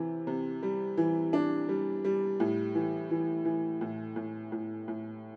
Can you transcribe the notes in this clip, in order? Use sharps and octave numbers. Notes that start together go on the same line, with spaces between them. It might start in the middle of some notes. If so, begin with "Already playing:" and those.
Already playing: C3 E3
C3
G3
E3
D4
G3
G3
A2
E3
E3
E3
A2
A2
A2
A2